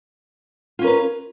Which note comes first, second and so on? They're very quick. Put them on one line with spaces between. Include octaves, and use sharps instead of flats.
F4 C#4 A#4 B4